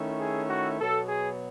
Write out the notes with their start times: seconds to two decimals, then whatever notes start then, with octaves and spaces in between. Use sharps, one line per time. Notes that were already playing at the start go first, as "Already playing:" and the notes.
Already playing: D#3 A3 C#4 E4
0.20 G#4
0.49 F#4
0.78 B2 F#3 B3 A4
1.08 G#4